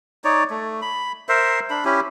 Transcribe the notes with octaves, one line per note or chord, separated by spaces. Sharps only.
D#4 C#5 D5
A3
B5
A#4 C5 E5
D4 B5
C#4 E4 G4